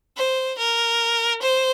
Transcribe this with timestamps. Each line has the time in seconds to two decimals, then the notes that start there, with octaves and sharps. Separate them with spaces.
0.16 C5
0.58 A#4
1.41 C5